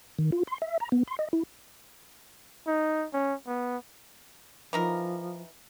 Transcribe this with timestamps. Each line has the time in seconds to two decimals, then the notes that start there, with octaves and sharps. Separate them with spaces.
0.18 D#3
0.32 F4
0.47 C6
0.62 E5
0.80 A#5
0.92 B3
1.08 C6
1.19 D#5
1.33 E4
2.67 D#4
3.14 C#4
3.47 B3
4.73 E3 F3 D#4 A#4